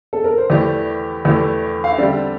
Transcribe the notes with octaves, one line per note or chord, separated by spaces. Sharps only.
A4
A#4
C5
E2 E3 A3 E4 G4 D5
E2 E3 A3 E4 G4
F5
E5
D3 G3 C4 G4 D5